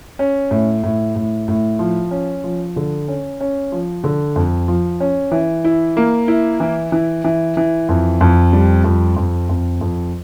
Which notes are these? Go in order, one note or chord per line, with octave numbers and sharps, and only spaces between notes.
C#4
A2
A2
A2
A2
F3
C#4
F3
D3
C#4
C#4
F3
D3
F2
F3
C#4
E3
E4
A#3
E4
E3
E3
E3
E3
F2
F2
G3
F2
F2
F2
F2